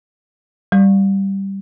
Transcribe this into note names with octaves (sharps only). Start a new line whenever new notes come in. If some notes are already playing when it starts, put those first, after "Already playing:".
G3